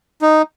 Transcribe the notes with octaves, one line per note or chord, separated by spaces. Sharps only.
D#4